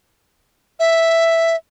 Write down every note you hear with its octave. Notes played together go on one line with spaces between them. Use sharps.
E5